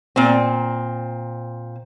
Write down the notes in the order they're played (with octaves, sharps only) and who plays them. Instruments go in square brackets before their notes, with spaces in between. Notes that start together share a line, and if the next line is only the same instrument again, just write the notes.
[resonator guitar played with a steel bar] A#2 C4